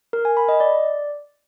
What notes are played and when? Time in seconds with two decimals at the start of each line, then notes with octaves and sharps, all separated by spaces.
0.13 A#4
0.25 G#5
0.37 B5
0.49 D#5
0.60 D5